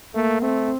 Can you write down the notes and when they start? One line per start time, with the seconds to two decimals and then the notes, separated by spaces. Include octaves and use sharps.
0.15 A3 A#3
0.41 A3 C4